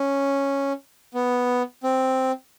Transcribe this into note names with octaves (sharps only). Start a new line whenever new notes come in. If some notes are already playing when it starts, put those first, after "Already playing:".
Already playing: C#4
B3
C4